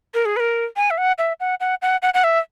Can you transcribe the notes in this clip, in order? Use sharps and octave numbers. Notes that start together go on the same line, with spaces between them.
A#4
G#4
B4
A#4
G#5
E5
F#5
E5
F#5
F#5
F#5
F#5
F#5
E5